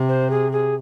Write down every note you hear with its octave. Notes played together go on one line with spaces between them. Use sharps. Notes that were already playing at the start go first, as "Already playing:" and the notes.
Already playing: C3
C5
G#4
G#4